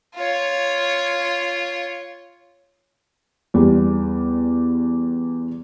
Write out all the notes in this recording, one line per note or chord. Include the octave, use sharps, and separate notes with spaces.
F4 C#5
E2 G3